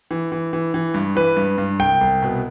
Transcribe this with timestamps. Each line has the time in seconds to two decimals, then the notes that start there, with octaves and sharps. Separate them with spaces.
0.11 E3
0.32 E3
0.53 E3
0.74 E3
0.94 G2
1.16 E3 B4
1.37 G2
1.58 G2
1.79 C2 G5
2.01 C2
2.22 B2